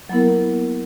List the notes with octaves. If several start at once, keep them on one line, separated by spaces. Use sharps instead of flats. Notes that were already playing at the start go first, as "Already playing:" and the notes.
F#3 A#3 B3 E4 A#4